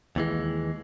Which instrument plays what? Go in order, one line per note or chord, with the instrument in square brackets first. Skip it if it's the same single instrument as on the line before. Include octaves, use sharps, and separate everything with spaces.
[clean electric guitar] D#2 E3 G#3